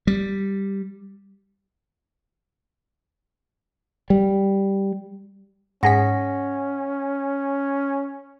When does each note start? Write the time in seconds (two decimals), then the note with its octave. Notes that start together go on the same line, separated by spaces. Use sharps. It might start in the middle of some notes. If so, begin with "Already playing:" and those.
0.07 G3
4.10 G3
5.83 G#2 C#4 G#4 F#5 A#6 B6